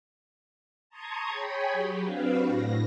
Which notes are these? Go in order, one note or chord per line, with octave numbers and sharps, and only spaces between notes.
A5 A#5 C6 C#6 D#6 G#6
G#4 C#5 G5 G#5 B5
F#3 G4
C4 D4 F#4 B4 F5
A2 A#6